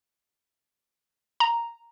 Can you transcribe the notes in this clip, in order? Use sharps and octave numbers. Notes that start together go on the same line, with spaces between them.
A#5